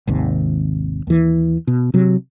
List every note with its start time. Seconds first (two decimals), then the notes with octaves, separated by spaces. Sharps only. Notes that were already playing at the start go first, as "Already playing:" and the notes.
0.07 G#1 D#2 C3
1.07 D#2 E3
1.67 B2
1.94 C3 F#3